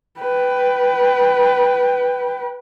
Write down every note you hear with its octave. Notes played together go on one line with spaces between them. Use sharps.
B4 G5